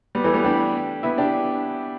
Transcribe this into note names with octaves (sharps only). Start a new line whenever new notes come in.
G3 B3
E3 A3
G3 B3
D4 G4
B3 E4
D4 G4